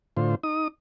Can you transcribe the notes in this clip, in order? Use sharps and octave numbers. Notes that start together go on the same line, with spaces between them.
A2 D3 F4 C5
D#4 D#6